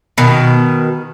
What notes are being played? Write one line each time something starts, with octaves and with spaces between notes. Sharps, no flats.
B2 D#3